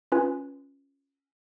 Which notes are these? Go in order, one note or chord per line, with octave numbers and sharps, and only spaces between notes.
C#4 F4 B4 G#5